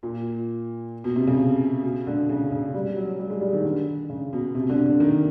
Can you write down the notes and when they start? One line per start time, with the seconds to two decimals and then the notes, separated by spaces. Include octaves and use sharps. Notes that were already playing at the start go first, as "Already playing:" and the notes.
0.03 A#2
1.04 B2
1.16 C3
1.27 C#3
1.84 B2
2.07 D3
2.29 C#3
2.52 C#3
2.74 G3
2.97 F#3
3.19 G3
3.30 G#3
3.41 G3
3.53 D#3
3.64 D3
4.10 C#3
4.33 B2
4.55 C3
4.69 D3
4.85 D3
5.00 D#3